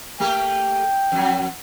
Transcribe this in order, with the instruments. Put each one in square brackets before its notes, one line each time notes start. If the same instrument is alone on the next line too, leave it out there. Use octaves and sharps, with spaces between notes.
[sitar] A3 A#3 G4 [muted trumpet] G5
[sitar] F2 F#3